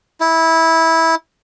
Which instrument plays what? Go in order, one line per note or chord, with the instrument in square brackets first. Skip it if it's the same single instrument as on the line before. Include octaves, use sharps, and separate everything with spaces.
[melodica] E4